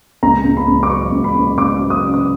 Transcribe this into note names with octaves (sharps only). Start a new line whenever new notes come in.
C#2 A#5
C#2
B5
C#2
D6
F#3 C#6
C#2
B5
C#2
C#2 D6
F#3
D#6
C#3
D#6